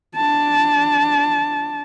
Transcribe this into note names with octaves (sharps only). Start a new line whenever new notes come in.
D4 A5